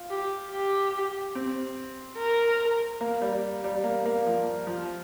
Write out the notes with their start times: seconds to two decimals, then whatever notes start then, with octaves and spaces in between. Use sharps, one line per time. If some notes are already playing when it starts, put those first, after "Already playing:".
Already playing: F4
0.10 G4
0.51 G4
1.35 C4
2.18 A#4
3.01 A#3
3.22 G3
3.64 G3
3.84 A#3
4.06 A#3
4.26 F3
4.67 F3